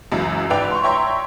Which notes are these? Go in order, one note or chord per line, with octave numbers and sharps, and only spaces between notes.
C#2 F#2 E3
G#2 B4 D5 E5 G5 F7
C6 C#6
C#5 E5 G5 A#5 C6 C#6